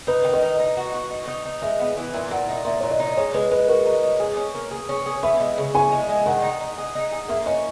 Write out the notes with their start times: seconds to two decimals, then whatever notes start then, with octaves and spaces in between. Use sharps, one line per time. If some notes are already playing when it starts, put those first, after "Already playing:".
0.07 D#4 B4
0.25 D#3
0.33 D#5
0.42 D#4
0.59 D#4
0.77 F#4
0.94 F#4
1.10 D#4
1.28 D#4
1.46 D#4
1.62 G#3 E5
1.80 B3
1.97 E3
2.13 A#2 E5
2.31 A#2 F#5
2.48 D#4 E5
2.65 A#2 E5
2.80 A#2 C#5
2.91 D#5
2.99 D#4
3.17 G#3 C#5
3.34 G#3 B4
3.51 G#3 B4
3.68 F#4 A#4
3.86 D#4
4.03 G#3
4.20 G#4
4.37 C#4
4.54 A#3
4.71 G#4
4.89 C#4
5.06 G#4
5.23 B3 E5
5.40 G#3
5.58 C#3
5.74 B3 G#5
5.92 G#3
6.09 G#3
6.26 D#3 F#5
6.43 D#4
6.60 D#4
6.78 G#4
6.95 D#4
7.12 G#4
7.28 A#3 E5
7.46 C#4 D#5